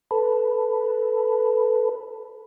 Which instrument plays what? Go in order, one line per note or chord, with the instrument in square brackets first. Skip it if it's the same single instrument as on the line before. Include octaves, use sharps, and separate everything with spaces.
[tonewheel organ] A4 B4